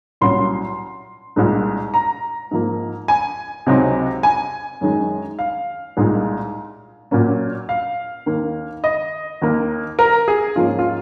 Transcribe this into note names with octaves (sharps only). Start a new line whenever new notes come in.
C2 A#2 F#3 C#4 C6
C2 A#2 G#3 D#4
A#5
G#2 F3 A#3
G#5
C#2 C3 F#3 C4 D#4
G#5
F#2 D#3 G#3 D#4
F5
C2 A#2 G#3 D#4
A#2 F#3 A#3 C#4
F5
D#2 D#3 A#3
D#5
D#2 D#3 A#3
A#4
G#4
G#2 F3 A#3 C#4 F4
F4